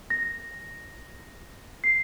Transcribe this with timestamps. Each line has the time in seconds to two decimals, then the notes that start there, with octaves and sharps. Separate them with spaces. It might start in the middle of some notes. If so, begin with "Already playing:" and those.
0.10 A#6
1.84 C7